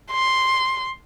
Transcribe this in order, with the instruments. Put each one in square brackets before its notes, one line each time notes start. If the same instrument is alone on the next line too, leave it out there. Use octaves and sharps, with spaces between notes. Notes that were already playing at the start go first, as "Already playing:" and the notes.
[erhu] C6